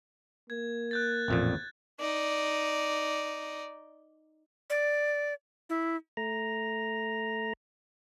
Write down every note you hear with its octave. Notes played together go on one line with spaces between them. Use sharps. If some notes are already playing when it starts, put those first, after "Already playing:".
A#3 G#6
F#6 G6 A6
A1 F2 A#2
D#4 D5
D5
E4
A3 A#5